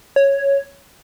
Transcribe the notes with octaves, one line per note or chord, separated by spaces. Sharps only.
C#5